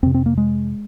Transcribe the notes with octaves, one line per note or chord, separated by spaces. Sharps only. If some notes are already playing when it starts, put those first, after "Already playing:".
F2 C3 C4
C4
A#3
G#3